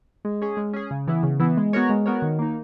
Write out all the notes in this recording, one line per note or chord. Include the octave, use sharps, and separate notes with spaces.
G#3
C#4 G#4
G#3
C#4 G#4
C#3
E3 B3 E4
C#3
E3 B3 E4
G#3
B3 F#4 A#4 C#5
G#3
B3 F#4 A#4 C#5
D#3
A#3 D#4